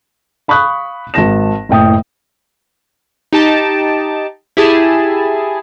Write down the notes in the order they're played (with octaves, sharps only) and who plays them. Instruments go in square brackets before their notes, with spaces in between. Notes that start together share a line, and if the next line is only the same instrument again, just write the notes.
[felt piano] F5 B5 C#6 D#6 F#6
G#1 A5 A#6 E7
F#1 A2 G5 D#6
[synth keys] D#4 G4 A5 D6
E4 G4 G#4 G#5 A5